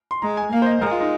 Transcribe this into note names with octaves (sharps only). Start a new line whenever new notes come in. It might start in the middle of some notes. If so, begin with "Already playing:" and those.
C6
G#3 A#5
G#5
A#3 F5
C5
D#5
G#3 A#4
F4
D#4